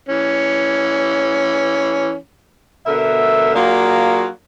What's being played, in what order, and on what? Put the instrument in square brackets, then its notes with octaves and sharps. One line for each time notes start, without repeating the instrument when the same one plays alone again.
[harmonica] E3 C#4
[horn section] B2 D3 A#4 E5
F#3 A#3 D4 F4 F#4 G#4